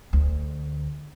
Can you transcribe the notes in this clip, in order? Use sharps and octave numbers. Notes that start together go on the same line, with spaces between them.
D2